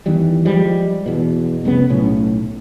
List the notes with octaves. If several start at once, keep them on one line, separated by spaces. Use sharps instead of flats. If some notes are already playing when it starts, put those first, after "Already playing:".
E2 D#3 E3 G3
F3 G3 G#3
E2 B2
F1 C2 C#3 B3
B1 A2 C#4